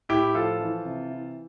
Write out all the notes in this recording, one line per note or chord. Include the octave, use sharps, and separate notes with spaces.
A2 E4 G4
F3 F4 A4
E3
C3
E3